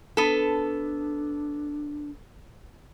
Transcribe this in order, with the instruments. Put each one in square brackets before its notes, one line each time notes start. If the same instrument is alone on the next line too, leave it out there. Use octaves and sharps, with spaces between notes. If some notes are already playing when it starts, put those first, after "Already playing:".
[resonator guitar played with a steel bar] B3 A4 [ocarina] D4